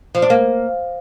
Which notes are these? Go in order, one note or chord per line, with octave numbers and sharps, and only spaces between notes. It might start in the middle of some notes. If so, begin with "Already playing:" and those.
F3
D4
A#3